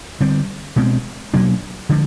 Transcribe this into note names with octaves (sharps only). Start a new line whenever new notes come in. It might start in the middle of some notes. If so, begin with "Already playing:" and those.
D3 G3 C4
B2 G#3 C4
B2 F#3 A#3 D4
D3 F3 G#3